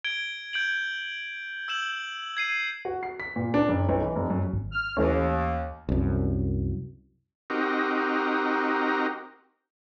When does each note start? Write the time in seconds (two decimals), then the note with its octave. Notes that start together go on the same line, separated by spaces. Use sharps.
0.05 G#6 D7 G7
0.53 G6 D7 F#7
1.68 E6 G6 E7 F#7
2.37 G#6 C7 D#7
2.85 F#4
3.03 C7
3.20 B6
3.36 A#2
3.54 D4
3.69 F#1
3.89 B1
4.02 E3
4.15 F1
4.30 F#2
4.53 G#1
4.72 F6
4.97 D#2 E3 A3 C#4
5.89 C2 F#2
7.50 C4 D#4 F#4 G4 A#4